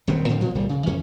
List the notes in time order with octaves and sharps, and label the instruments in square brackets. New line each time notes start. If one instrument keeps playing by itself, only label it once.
[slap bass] D#1 D#3 B3 C4
A2 D3 F3 C4
A#2 F3
D1 C2 A#2 G3
C#3
F2 E3 C#4